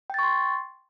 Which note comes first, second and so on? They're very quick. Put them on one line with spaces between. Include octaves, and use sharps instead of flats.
G5 A6 C#6 C6